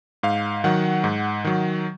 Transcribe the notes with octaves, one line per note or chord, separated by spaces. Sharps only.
G#2 F5
D#3 F#3 F#5
G#2
D#3 F#3